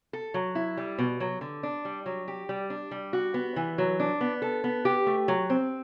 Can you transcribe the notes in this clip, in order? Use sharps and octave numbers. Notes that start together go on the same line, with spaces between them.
A4
F#3
E4
G3
B2
F#3
D3
D4
G3
F#3
G4
G3
D4
G3
F#4
B3
E3
F#3
D4
B3
A4
B3
G4
A3
F#3
C4